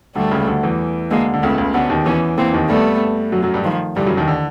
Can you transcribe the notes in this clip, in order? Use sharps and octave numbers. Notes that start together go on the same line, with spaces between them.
D2 D3 G3 A3
C#2 C#3
D2 D3
E2 E3
D2 D3 G#3 A#3
D3
C#2 C#3 A3 B3
C#2 C#3
D2 D3 B3 C#4
D#2 D#3
E2 E3 B3 C#4
E2 E3 A#3 C4
D#2 D#3
G2 G3 A3 B3
F#2 F#3
F#2 F#3
G2 G3
D#3 F3
G2 D3 E3 G3
F#2 F#3
D#2 D#3
D3